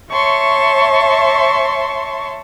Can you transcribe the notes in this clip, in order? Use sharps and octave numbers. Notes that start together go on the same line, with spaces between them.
C#5 E5 A5 C6 C#6